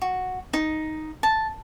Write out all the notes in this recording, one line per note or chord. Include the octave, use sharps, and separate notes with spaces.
F#4
D#4
A5